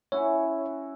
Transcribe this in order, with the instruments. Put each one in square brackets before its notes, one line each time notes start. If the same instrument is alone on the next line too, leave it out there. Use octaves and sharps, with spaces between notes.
[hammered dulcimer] C#4 E4 F#4 [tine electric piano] C#5